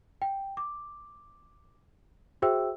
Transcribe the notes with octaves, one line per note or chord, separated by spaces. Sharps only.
G5
D6
F#4 G#4 C5 E5 G5 E6